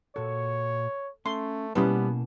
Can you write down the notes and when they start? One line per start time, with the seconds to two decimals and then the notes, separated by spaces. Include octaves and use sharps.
0.16 A#2 F#4 A4 C#5
1.26 A3 C#4 C6
1.75 B2 G3 A#3 B3 C#4 E4 B4 A5